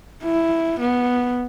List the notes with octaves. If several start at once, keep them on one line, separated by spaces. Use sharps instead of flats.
E4
B3